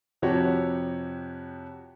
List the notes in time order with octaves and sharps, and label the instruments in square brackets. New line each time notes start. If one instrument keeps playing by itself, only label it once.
[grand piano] F2 C3 F3 F#4 G4 C#5